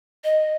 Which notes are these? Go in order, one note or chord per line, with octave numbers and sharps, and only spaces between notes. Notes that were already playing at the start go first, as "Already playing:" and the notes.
D#5